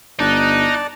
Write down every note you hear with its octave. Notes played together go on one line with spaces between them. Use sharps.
G1 D#4 D5 A5 F#6